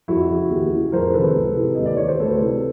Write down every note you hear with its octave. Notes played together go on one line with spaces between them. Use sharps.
F2 E4 F#4
C#3 E3
D#2
C#3 E3
F2 A#4 C5
C3 D#3 A4 B4
C#2
C3 E3
D#2 D#5
D5
D#3 C#5
C5
D2 A4 B4
C3 E3